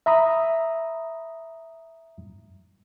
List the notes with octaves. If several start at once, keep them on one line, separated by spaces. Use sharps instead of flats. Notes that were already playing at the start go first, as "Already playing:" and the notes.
E5 A#5 B5 D#6